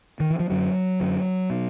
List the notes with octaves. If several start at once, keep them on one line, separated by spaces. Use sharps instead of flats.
D#3
E3
F3
F#2 D3 F#3
F#2 D3
B2